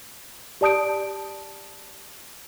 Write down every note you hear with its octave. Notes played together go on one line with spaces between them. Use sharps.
G4 D5 A5 D#6 G6 D7